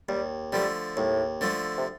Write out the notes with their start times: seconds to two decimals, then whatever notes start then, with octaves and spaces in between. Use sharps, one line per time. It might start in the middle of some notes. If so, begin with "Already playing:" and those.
0.09 D#2 G3
0.53 D3 F3 G3 A3
0.96 D#2 A2
1.41 D3 F3 A3
1.78 C3